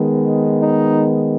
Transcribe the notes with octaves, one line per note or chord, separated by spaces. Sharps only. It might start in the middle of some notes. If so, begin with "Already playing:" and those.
Already playing: D#3 G#3 B3
D#4